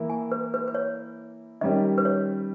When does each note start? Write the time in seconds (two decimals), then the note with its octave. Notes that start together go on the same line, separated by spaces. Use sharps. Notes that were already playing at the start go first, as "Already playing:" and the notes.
Already playing: E3 A#3 E4
0.10 G#5
0.32 B4
0.54 B4
0.68 B4
0.75 C#5
1.61 D#3 G3 C#4 G4 A#4 D#5
1.98 B4
2.05 C#5